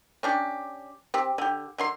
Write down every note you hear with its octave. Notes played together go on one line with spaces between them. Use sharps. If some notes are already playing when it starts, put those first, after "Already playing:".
C#4 D4 G4
C4 G4
D3 G4
D3 F#3 C6